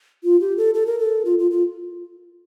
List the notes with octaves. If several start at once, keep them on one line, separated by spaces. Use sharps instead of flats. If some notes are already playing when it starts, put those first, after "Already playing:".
F4
G4
A4
A4
A#4
A4
F4
F4
F4